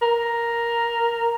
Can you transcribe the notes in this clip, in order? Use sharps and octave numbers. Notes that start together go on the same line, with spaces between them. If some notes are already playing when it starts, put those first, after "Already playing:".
A#4